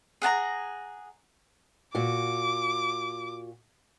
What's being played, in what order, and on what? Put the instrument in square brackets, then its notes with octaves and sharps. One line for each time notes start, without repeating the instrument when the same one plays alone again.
[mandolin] G#4 F#5 A5 A#5
[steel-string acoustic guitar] A#2 F#4 [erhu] D6